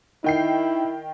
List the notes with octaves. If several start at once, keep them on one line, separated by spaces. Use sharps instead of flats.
D#3 D#4 E4 D#5 G5 C7